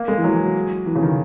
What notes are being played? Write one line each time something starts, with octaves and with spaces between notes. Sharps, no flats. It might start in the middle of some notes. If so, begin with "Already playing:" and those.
Already playing: A#3
G#3
E3
F#3
E3
C#3
D#3